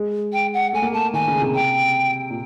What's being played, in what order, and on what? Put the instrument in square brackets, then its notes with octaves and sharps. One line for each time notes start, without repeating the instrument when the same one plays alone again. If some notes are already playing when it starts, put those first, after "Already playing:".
Already playing: [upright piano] G#3
[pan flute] G5
F#5
[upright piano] A3 [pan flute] G#5
[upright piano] A#3
[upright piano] A3 [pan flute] A5
[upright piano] D#3 [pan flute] G#5
[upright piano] C#3
C3
[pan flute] G5
[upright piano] A#2